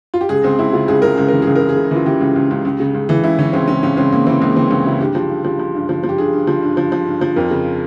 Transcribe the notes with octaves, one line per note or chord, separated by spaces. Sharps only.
F4
G4
C#2 G#4
C#2 C4
C#2 E4
C#3 F4
C#2 G#4
C#2 A#4
C#2 G#4
E3 A#4
C#2 G#4
A#4
C#2
G#4
C#3
E3 F4
E3 G4
C#2
C#2
C#2
C#2
C#3
C#2
E3
C#2 E4
E3 C#4
C#2 C4
C#2 C#4
C#2 C#4
C#2 C4
C#2 A#3
E3 C4
C#2 A#3
E3 C4
C#2 C#4
C#3 E4
G2 G4
F3
G2
F3
F3
G2
F3
F3
G4
G2 G#4
G2
F3
G2
F3
F3
G2
F3
F2 A#4
C#3